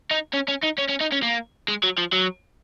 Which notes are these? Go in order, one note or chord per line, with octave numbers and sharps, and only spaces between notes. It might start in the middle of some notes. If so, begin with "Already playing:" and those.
D#4
C#4
C#4
D#4
C#4
C#4
D#4
C#4
A#3
G#3
F#3
F3
F#3